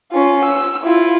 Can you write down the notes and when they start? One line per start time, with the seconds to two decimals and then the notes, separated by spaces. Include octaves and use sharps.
0.12 C#4 F4
0.45 E6
0.84 E4 F4